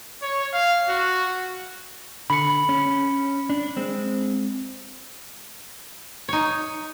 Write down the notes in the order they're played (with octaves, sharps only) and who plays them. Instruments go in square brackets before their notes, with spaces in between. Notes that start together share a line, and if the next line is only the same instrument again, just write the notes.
[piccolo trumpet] C#5
F5
F#4
[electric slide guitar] D3 [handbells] B5 C#7
[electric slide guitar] C#4
D4
G#3 C4
[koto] D#4 C#5